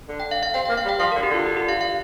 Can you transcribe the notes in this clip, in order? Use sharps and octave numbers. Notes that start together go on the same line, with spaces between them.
D3
G5
F5
F5
C4 G5
A#3 G5
F5
G3
G5
F3 F5
D3 A#4
G4
D3 F4
G4
G4
F5
F5